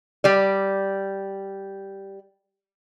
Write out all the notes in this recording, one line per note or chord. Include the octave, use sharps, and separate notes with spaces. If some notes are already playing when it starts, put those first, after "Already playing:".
G3 D5